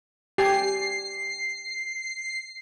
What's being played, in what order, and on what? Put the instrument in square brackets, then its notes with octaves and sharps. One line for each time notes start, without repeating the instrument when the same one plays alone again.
[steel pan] G4 G#5 [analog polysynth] C7